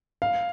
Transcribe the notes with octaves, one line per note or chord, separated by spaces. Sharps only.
F5